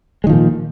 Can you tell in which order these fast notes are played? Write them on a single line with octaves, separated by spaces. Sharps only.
G#3 D#3 F3 A#2